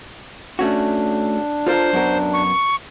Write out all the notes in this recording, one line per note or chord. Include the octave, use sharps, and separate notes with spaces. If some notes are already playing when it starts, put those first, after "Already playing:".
A3 C#4 D4 F#4
F4 A4 A#4 C5
F#2 B3 A#4
C#6